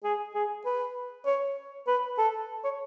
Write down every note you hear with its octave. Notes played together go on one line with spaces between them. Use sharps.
G#4
G#4
B4
C#5
B4
A4
C#5